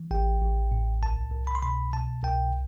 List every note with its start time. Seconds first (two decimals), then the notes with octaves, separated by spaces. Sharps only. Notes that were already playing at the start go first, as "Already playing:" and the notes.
Already playing: E3
0.11 A1 G5
0.41 A1
0.72 A2
1.02 C2 A5
1.32 C2
1.47 B5
1.55 C6
1.63 B2 B5
1.93 B2 A5
2.23 C2 G5